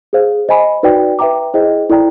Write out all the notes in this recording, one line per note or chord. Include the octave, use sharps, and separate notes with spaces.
G#4 C5 F5
C5 D#5 G#5 B5
D#4 F#4 B4 D5 G5
B4 E5 G5 A#5 D6
E4 G#4 C5 D#5 G5
E4 A4 D5 G5 A#5